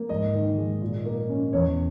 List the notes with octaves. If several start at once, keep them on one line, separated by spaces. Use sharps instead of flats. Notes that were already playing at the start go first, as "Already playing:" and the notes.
Already playing: A#3
G#2 D#5
D#3
G#3
A#2
A#3
C#4
E2 C#5